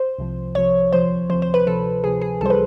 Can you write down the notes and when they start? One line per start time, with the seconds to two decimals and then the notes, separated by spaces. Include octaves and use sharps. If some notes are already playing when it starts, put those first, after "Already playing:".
Already playing: C5
0.19 C2 C3 F3
0.55 C2 C3 F3 C#5
0.92 D2 C3 F3 C5
1.30 D2 C3 F3 C5
1.42 C5
1.54 B4
1.67 D2 C3 F3 A4
2.04 D2 C3 F3 G#4
2.22 G#4
2.41 C#2 C3 E3 G3 A4 C5
2.50 B4